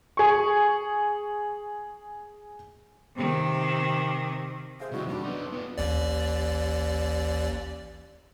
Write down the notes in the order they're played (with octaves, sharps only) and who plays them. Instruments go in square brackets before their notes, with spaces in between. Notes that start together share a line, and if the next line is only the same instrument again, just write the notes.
[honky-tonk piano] G#4 C#6
[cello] C3 D#3
[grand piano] G#4 E5 F5 [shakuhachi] C5
[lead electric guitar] D#2 C3 [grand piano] G3 D#4 E4 [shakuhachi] F#4
[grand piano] F#1 F#4 C6 [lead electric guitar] G3 [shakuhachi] D4
[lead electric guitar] B3 D#4
B3 F4
[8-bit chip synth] A1 D#2 D5